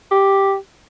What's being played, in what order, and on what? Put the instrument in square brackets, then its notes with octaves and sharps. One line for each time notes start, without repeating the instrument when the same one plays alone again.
[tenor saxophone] G4